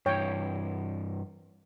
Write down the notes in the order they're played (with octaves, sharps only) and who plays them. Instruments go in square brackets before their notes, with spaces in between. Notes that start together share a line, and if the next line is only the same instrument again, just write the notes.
[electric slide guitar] G2 E3 [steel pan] C#5 G5